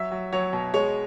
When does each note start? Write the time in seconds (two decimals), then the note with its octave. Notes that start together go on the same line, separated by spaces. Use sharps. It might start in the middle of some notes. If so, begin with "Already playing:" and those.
Already playing: F#3 E5
0.11 F#3
0.32 F#3 C#5
0.53 B2
0.74 G#3 C#5